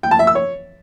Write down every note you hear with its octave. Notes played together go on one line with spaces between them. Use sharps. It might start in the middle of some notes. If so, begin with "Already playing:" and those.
G5
A5
E5
E6
C#5